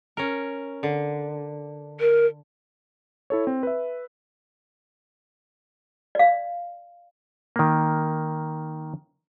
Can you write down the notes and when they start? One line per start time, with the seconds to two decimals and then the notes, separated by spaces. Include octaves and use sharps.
0.17 C#4 A#4
0.83 D3
2.00 A#4
3.30 E4 A4 C#5
3.47 C4
3.63 B4 E5
6.15 D5 F5
7.56 D#3 A#3